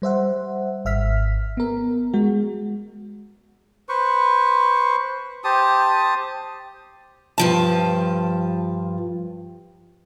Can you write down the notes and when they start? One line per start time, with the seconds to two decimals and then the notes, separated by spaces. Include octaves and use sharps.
0.02 G3 C5 E5 F#5
0.85 G#1 E5 F6 B6
1.57 B3 A#4
2.13 G#3 F#4
3.89 B4 C5 C#6
5.44 G4 C5 A5 D#6
7.38 G2 F3 A5